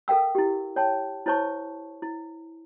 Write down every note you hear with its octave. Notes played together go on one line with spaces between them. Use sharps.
A4 A#4 F5 G5 E6
E4 G4
C#5 G5 A5
E4 C5 C#5 A5 C#6
E4